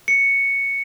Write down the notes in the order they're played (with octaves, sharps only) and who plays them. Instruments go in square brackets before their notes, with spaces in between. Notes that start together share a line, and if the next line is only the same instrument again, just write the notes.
[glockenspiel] C#7